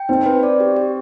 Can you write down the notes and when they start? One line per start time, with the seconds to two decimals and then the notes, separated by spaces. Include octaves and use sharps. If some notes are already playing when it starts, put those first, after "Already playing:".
Already playing: G5
0.09 C4 D#4
0.26 B4
0.43 D5
0.60 G4
0.76 G4